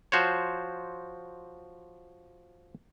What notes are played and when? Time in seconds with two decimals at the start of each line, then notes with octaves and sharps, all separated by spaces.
0.12 F3 F#4 C5 C#5